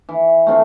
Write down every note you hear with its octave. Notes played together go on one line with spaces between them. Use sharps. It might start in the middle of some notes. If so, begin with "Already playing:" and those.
E3
A3 C4 F4